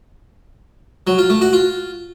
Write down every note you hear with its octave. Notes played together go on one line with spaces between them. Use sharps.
F#3
F4
A3
F#4
F4